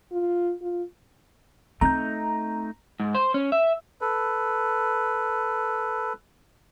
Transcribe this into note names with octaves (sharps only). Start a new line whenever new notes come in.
F4
F4
A3 C4 D#4 A#5 G6
G#2
C5
C#4
E5
A4 B4